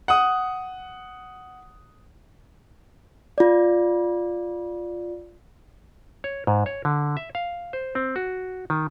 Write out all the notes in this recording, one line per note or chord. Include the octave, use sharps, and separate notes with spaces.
F#5 D#6
F4 D5
C#5
G#2
C#5
D3
E5
F5
C5
C4
F#4
D#3